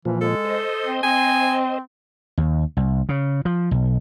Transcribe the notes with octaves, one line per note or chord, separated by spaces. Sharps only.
A#2 E3 F3
G#3 A4
C5 D#5
C4
C4 G#5
D#2
C2
C#3
F3
B1